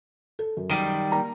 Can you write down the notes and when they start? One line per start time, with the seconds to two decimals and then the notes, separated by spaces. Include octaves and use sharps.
0.39 A4
0.57 F#2
0.71 D#3 G3
1.11 A#3 A#5